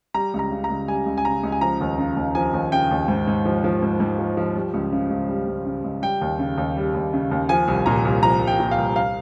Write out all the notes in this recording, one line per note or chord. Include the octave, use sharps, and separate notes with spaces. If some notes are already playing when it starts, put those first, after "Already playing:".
G3 A#5
C#2 A#5
C#3
A#5
C#2
G3 G#5
C#2
G#5
C#3 A#5
C#2
G#5
F3 A#5
D#2
C#3
D#2
F3 G#5
D#2
C#3 G5
D#2
G#2
G#2
F3
F3
G#2
G#2
F3
F3
G3
C#2
C#3
C#2
G3
C#2
C#3
C#2
G3 G5
D#2
C#3
D#2
G3
D#2
C#3
D#2
F3 G#5
C2
A#2 A#5
C2
F3 A#5
C2
G5
A#2
F5
C2
F5